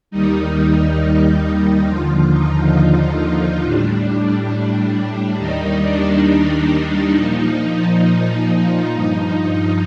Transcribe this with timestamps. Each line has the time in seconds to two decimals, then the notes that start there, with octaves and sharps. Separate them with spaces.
0.11 D#2 D#3 G3 D#4
1.86 D#2 D3 F3 F4
2.31 D#4
3.62 A2 G3 D4
5.38 D#2 D#3 G3 D#4
5.82 D4
6.70 D4
7.14 A#2 F3 D#4
8.90 G2 F3